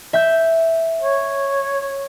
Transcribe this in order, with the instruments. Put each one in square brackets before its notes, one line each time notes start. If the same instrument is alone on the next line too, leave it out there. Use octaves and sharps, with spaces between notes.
[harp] E5 G6
[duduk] C#5